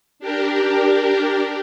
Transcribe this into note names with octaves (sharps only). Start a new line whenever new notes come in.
D4 G4 A#4